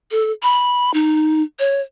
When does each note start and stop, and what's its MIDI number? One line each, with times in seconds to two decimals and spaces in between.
0.11 0.32 69
0.43 0.93 83
0.94 1.43 63
1.59 1.81 73